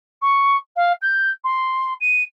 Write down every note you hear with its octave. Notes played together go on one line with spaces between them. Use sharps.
C#6
F5
G6
C6
D#7